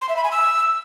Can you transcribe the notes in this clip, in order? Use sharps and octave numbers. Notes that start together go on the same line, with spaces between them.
C6
E5
B5
G#5
E6